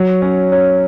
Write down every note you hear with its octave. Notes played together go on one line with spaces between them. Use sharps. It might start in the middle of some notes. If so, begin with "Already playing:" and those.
Already playing: F#3
C#4
C#4